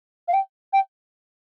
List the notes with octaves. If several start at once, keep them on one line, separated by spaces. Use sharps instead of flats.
F5
G5
G5